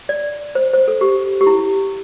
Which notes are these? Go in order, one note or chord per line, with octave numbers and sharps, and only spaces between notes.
D5
C5
C5
A4
G4
G4
E4